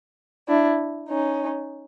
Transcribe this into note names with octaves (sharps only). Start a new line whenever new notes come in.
D4 E4
C#4 D#4